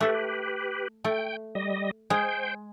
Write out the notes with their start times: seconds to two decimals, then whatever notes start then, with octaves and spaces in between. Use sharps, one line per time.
0.01 A3 G4 A4 B4
1.05 A3 G5
1.55 G3 D#5
2.10 G#3 C5 G5